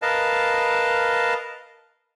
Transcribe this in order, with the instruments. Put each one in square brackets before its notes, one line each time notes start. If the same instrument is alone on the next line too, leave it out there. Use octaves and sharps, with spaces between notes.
[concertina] A#4 B4 D#5 F5 A5